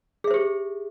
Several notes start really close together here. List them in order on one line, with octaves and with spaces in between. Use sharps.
G#4 E5 C5 G4